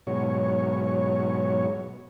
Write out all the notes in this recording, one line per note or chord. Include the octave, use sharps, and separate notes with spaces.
G#2 B2 F#3 C#5